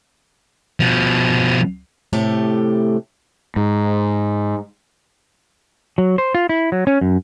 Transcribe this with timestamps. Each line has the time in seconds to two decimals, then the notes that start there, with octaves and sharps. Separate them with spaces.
0.80 B2 F3
2.13 A2 C3 A3 G4
3.56 G#2
5.98 F#3
6.18 C5
6.35 F4
6.49 E4
6.72 F#3
6.87 C#4
7.01 F#2